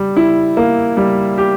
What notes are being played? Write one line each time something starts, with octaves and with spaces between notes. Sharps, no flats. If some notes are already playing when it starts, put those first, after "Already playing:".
Already playing: G3
E4
A#3
G3
G4